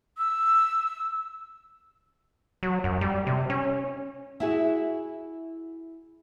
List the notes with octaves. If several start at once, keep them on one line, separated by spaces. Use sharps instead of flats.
E6
F#3
F#2
G3
C3
C#4
E4 F#4 G#4